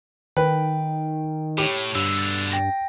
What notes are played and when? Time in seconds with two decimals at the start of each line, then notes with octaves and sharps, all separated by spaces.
0.37 D#3 B4 G5
1.58 A2 G4 C#5 B5
1.95 G2 B2 D3 E6
2.19 A6
2.52 G5 A#6